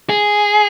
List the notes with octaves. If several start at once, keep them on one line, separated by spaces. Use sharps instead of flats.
G#4